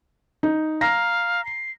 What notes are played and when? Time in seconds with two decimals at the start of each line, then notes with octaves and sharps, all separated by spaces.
0.43 D#4
0.81 F5 A#5 A#6
1.45 C7